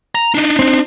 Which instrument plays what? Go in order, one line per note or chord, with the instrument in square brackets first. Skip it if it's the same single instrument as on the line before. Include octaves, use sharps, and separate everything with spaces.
[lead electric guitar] A#5
D4 D#4
[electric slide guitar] C4